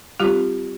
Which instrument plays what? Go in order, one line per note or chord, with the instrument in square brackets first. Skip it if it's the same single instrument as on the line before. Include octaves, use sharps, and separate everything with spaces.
[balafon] G3 C4 F4 G4